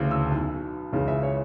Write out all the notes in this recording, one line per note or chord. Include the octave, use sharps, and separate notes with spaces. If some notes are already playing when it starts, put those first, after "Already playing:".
Already playing: D2 C#3 E3
E6
B1 B2
C#2 C#3 E3
E5
C#5